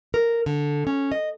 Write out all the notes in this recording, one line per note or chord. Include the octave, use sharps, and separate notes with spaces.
A#4
D3
C#4
D#5